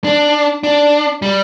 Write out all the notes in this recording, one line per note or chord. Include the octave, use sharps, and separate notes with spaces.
D4
D4
G3